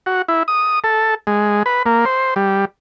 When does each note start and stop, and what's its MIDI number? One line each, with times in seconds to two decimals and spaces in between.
0.06 0.22 66
0.28 0.43 64
0.48 0.79 87
0.84 1.15 69
1.27 1.63 56
1.66 1.83 71
1.86 2.05 58
2.05 2.34 72
2.36 2.65 55